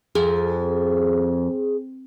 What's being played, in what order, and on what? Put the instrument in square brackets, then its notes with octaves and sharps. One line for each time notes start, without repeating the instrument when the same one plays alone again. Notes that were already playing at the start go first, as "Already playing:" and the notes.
[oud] F2 [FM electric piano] G#4